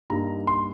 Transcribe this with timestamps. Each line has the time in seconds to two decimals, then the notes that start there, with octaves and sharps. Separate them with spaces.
0.10 G2 G3 A#3 D#4 A#5
0.47 C6